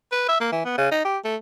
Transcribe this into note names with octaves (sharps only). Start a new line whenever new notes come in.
B4
E5
A#3
E3
B3
C#3
D#4
G4
A3